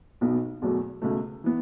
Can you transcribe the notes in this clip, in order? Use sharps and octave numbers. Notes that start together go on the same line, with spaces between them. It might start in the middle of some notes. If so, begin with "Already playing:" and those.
B1 B2 B3
E2 B2 F#3 A3
C#2 B2 A3
E3 B3